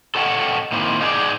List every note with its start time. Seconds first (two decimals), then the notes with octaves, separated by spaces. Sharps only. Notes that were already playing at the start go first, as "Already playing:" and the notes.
0.15 A4 C#5 D#5 F#5 G5 A5
0.72 D#3 A#3 C4 E4 C5
1.01 D#4 E4 G#4 A#4 C5 D5